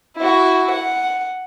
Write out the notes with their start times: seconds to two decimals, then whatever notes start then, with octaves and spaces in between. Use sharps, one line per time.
0.17 E4 F#4
0.71 F#5